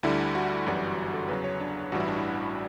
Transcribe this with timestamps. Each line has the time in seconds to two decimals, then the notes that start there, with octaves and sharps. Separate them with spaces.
0.03 D2 D3 G3 E4
0.35 F#4
0.66 G1 F#2 E3 G3
1.14 A4
1.28 E2 C#3 F#3 B4
1.44 C#5
1.60 D4
1.92 A1 G2 E3 G3 F#4
2.00 E4
2.08 D4
2.17 E4